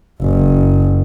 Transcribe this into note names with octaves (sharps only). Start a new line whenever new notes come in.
F#1